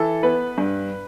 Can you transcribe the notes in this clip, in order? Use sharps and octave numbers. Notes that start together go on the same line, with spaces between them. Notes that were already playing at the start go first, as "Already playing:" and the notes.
Already playing: E3 A4
B3 B4
G2